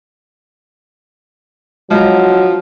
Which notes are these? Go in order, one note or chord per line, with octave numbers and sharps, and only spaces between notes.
F3 F#3 G#3 D4 A#5